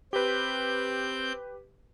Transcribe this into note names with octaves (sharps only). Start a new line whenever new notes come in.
C4 G4 B4 G6